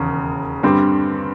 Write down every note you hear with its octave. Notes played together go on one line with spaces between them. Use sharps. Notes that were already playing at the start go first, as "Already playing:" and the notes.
Already playing: E1 D#2 C#3
G2 D3 G3 C4